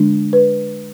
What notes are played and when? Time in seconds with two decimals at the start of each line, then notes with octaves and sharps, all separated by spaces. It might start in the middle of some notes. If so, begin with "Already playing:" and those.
Already playing: D3 G#3 D4
0.33 B4